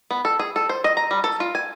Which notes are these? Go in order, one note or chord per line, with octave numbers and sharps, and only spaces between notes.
B3
A4
G#4
A4
C5
D#5
A#5
G3
A4
F4
G#5